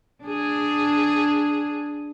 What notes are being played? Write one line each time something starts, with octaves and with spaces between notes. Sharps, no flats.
D4 G#4